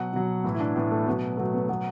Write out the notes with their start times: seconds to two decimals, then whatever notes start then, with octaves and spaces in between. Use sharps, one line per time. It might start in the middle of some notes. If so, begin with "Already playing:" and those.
Already playing: B2 F#3 F#5
0.13 B2 F#3
0.44 A2 E3 E4
0.54 E4
0.60 D4
0.76 A2 E3 B3
0.91 A3
1.07 B2 F#3 B3
1.37 B2 F#3 A3
1.54 B3
1.69 B2 F#3 B3